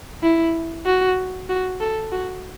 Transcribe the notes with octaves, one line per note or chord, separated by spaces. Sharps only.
E4
F#4
F#4
A4
F#4